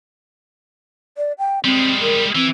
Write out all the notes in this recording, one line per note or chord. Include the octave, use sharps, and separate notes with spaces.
D5
G5
G3 G#3 C4
A#4
E3 C4